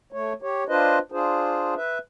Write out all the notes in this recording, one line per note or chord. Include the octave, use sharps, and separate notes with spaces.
A3 C#5
G4 C#5
D4 F4 B4 C5 D#5
D4 F4 G#4 C5
B4 E5